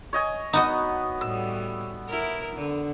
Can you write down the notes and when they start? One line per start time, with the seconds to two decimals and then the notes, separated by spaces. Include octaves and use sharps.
0.13 C#5 D#5 G#5
0.53 B3 D#4 F#4 D#5
1.21 A2 G3 E6
2.09 E4 A#4
2.56 D3